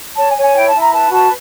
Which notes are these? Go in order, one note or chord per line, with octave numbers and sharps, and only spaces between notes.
C#5 A5
G#5
C#5
G#5
E4 G5
A5
E4
A#5
B4 A5
F#4 A5